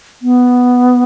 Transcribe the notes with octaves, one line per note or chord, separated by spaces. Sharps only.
B3